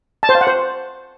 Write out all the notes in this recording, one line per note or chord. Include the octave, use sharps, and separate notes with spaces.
A5
C5
F5
F#5
C5